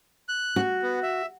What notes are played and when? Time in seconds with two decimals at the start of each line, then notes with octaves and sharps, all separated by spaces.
0.29 F#6
0.56 F#4
0.82 B3
1.03 E5